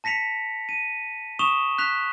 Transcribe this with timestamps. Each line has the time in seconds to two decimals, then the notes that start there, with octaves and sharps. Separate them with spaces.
0.04 A5 A#6 B6 C#7 F7
0.69 D#7
1.39 C#6 D#6 E7 F7 G7
1.78 F#6 B6 F7